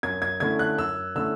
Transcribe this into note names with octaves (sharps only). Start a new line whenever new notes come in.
F#2 G#6
G#6
D3 A3 C#4 E4 G#6
F#6
F#2 E6
D3 A3 C#4 E4 E6